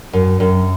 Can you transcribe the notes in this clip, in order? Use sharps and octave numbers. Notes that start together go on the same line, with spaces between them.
F#2
F#2